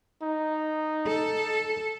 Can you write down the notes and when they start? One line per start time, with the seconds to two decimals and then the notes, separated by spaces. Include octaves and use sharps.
0.23 D#4
1.07 A4